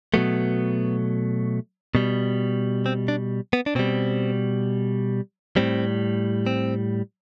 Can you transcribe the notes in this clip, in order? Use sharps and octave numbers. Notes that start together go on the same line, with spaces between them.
B2 F#3 A3 B3
B2 G3
C4
D4
B3
D4
B2 G3 C4
A2 G3 C4
C4